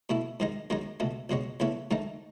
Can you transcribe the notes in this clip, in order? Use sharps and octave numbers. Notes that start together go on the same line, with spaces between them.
B2 A3 E4
G#2 D#3 G#3 D#4
F#2 D#3 G#3 D#4
C#2 B2 A3
C#2 B2 G#3 C#4
E2 C#3 E3 A3 C#4
G#2 D#3 A3 D#4